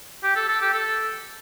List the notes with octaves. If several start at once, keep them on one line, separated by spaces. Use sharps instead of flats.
G4
A4
A4
G4
A4